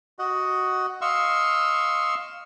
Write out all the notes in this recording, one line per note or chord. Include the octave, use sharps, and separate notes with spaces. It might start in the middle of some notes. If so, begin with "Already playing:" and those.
F#4 D#5 F#5
D#5 F5 C6 C#6 E6